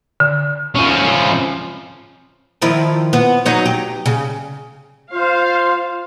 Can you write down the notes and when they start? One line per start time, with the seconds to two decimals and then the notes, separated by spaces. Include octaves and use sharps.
0.20 D3
0.75 F3 C#4
2.62 D#3 F3 E4
3.13 B3
3.46 F#3 D#4 C#5
3.66 G4
4.06 C#3
5.13 F4 C5 F5